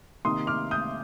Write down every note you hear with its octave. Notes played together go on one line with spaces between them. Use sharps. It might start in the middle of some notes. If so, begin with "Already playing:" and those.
C3 D#3 A#3 D#4 C6 D#6
D6 F6
D#6 G6